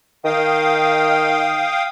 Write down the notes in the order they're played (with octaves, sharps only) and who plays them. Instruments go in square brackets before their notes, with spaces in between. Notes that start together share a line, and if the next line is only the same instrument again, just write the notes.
[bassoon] D#3 [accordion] F5 G5 D#6